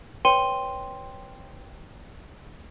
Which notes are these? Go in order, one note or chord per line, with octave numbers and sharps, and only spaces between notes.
B4 C#5 G5 C6 D#7 G7